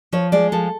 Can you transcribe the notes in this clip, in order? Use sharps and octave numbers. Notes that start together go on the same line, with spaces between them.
F3 C#5
G#3 D5
F3 A4